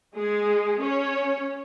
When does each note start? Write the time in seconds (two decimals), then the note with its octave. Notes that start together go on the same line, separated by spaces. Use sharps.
0.15 G#3 G#4
0.81 C#4 C#5